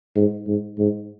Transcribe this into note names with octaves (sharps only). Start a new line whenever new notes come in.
G#2
G#2
G#2